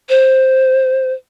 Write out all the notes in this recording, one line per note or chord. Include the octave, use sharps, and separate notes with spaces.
C5